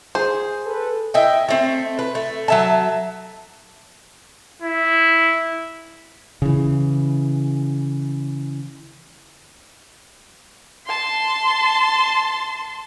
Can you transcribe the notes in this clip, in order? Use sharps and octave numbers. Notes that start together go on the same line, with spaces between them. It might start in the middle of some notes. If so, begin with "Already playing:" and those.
G#4 C5
A4 B4
E4 D#5 G5
A3 C4
B4
A3
F#3 E5 A5
E4
C#3 E3
A5 C6